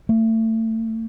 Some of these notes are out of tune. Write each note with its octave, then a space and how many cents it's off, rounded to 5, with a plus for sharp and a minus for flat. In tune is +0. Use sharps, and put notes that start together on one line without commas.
A3 +30